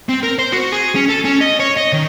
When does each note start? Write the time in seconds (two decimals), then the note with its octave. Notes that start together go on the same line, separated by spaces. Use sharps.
0.09 C4
0.23 A#4
0.39 C5
0.52 F#4
0.72 G#4
0.95 C#4
1.09 A4
1.25 C#4
1.41 D#5
1.60 C#5
1.77 D#5
1.93 D#3